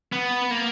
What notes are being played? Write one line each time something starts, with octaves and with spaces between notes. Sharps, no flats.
B3
A#3